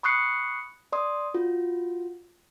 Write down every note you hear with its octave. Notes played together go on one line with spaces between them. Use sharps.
B5 C#6 D#6 F#6 C7 C#7
D5 C6 D#6
F4 F#4